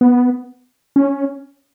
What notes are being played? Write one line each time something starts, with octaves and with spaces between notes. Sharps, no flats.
B3
C#4